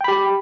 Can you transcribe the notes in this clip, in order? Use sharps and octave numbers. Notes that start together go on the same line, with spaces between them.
G4 G5 B5